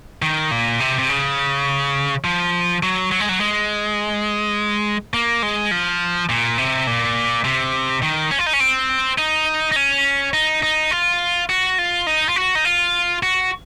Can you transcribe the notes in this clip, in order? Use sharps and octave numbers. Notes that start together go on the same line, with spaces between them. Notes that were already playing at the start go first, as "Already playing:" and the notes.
D#3
A#2
C3
C3
C#3
F3
F#3
F#3
G#3
F#3
G#3
A#3
G#3
F3
A#2
C3
A#2
C3
D#3
C#4
F4
D#4
C#4
C4
D#4
D#4
C#4
D#4
D#4
F4
F#4
F4
D#4
F4
F#4
D#4
F4
F#4